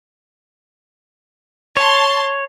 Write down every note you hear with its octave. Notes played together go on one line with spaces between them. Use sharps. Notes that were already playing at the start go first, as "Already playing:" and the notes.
C#5 A5 C6